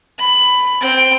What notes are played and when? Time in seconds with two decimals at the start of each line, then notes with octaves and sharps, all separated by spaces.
0.18 B5
0.81 C4 G5